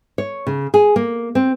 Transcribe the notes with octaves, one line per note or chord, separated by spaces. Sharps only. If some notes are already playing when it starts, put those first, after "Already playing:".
C#5
C#3
G#4
A#3
C4